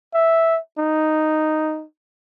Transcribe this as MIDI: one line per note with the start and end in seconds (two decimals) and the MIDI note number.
0.14 0.59 76
0.78 1.84 63